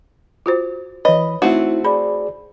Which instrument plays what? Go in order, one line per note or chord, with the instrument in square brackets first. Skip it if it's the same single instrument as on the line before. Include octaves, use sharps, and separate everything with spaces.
[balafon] F4 F#4 C5
[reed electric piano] E3 B5 [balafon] B4 C#5 [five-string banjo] D#5
[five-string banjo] A3 C4 F#4 [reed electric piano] D#4 E4
[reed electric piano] G#4 D5 [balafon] B5